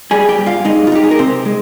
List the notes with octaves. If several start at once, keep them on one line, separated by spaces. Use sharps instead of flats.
G3 G#4 G#5
G4 G5
G2
F4 F5
G#3 D#4 D#5
F4
D#4 G4
G#4
A#4
C3 C4 C5
G#3